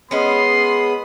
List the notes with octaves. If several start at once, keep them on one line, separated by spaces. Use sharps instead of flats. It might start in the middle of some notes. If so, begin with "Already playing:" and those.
G#3 B3 C#4 B5 C6 D#6